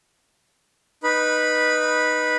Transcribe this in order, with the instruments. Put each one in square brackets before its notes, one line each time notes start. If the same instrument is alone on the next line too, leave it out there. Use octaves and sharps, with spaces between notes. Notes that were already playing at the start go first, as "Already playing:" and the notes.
[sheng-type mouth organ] D#4 B4 B5